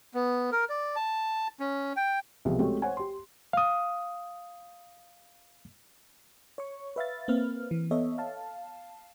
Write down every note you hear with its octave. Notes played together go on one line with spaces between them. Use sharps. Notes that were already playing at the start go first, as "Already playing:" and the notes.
B3
A#4
D5
A5
C#4
G5
C2 B2 F3 G4 G#4
G#3 A3 C4 C#4 F#4 G4
C5 C#5 F#5 G#5
G4 C6
F5 D#6
C#5 C#6
B4 E5 F5 A6
A#3 C4 B4 F6
E3
B3 A4 C#5 D#5 E5
F5 A5